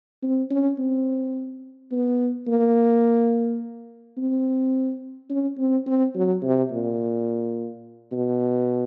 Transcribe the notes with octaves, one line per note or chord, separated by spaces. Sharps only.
C4
C#4
C4
B3
A#3
C4
C#4
C4
C4
F#3
C3
A#2
B2